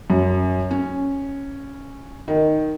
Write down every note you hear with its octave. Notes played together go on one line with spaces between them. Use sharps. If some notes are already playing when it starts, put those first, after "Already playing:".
F#2
C#4
D#3